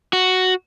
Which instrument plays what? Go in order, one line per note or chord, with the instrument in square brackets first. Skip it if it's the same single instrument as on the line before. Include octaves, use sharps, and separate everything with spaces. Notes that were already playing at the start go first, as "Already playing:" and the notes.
[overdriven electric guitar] F#4